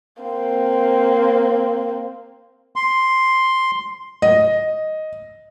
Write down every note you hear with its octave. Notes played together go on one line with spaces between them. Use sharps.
A#3 C4
C6
D#5